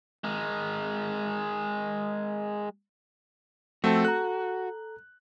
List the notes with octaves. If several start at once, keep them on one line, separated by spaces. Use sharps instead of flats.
G#3 A#4
F3 A3 C4 F#4 A4
A4 A#5 F#6